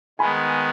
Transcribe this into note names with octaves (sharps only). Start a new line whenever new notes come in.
D#3 G#3 B3 G#5 B5